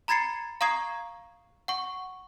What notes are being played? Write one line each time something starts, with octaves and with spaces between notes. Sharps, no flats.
A#5 B5 G#6 A6 C7 C#7
F5 A#5 C#6 D#6 G#6 C7
F#5 C#6